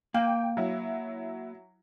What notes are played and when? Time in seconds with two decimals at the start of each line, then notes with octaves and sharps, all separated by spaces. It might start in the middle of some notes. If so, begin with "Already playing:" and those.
0.14 A#3 F5 G5
0.57 F#3 E4